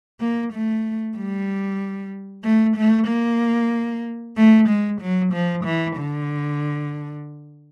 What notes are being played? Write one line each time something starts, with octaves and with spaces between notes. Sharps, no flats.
A#3
A3
G3
A3
A3
A#3
A3
G#3
F#3
F3
E3
D3